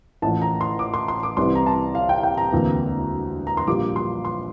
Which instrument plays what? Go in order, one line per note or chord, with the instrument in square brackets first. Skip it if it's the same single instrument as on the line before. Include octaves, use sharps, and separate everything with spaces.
[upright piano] A1 A2 F3 A3 A5
A#5
C6
D6
C6
C6
D6
C2 C3 E3 C6
A#5
A5
F5
G5
F5
G5
A#5
E1 D2 C3 E3 A#3
A#5
C6
A#1 A#2 G3 D6
C6
C6